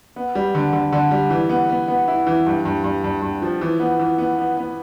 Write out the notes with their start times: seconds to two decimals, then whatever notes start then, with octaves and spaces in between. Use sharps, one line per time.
0.16 B3
0.35 G3
0.55 D3
0.73 D3
0.92 D3
1.11 G3
1.30 E3
1.49 B3
1.69 B3
1.88 B3
2.08 E4
2.27 E3
2.47 G2
2.65 G2
2.84 G2
3.04 G2
3.22 G2
3.42 F3
3.61 E3
3.80 B3
3.99 E3
4.18 B3
4.38 B3
4.57 B3